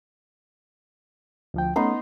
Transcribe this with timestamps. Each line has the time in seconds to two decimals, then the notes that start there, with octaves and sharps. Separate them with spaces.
1.54 D2 F3 G5
1.76 A3 B3 C#4 D#4 C6